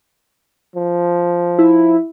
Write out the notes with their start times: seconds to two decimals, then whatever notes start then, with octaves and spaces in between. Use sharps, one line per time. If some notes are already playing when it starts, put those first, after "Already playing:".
0.76 F3
1.58 E4